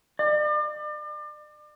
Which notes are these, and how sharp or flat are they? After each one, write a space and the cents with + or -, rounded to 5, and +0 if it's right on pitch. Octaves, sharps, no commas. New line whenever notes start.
D5 +35